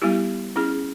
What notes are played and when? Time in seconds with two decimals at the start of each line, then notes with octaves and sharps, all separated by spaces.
0.02 G3 B3 E4 G4
0.56 C#4 E4 G#4